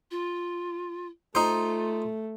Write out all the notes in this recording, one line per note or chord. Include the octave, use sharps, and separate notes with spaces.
F4
A3 D#4 F4 C5